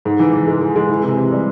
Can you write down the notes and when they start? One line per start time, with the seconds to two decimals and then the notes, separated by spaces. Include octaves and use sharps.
0.05 G#2
0.19 E3
0.33 E3
0.47 G#3
0.61 G#3
0.76 G#3
0.89 E3
1.03 C3
1.17 C3
1.32 G3